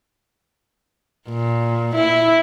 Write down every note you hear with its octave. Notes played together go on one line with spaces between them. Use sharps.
A#2
E4